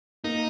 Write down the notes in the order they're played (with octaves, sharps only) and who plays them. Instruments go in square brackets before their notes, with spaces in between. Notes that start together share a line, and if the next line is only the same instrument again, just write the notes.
[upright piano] A#3 [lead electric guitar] D#4